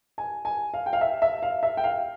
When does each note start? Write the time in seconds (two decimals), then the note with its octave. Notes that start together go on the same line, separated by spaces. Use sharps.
0.18 G#5
0.45 G#5
0.74 F5
0.86 G5
0.93 F5
1.01 E5
1.22 E5
1.43 F5
1.63 E5
1.77 G5
1.84 F5